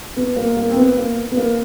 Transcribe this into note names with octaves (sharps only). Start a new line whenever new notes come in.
B3
A#3
A#3
C4
B3
A#3
B3
A#3